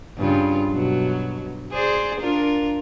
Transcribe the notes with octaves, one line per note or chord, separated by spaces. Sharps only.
G2 C#3 F4
B2 F#3
G#4 C5 D5
D4 F4 A#4